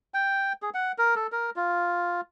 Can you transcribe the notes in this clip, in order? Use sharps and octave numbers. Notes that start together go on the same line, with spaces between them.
G5
G#4
F#5
A#4
A4
A#4
F4